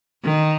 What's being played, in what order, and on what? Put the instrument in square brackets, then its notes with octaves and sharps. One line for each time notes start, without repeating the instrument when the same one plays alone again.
[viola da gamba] D#3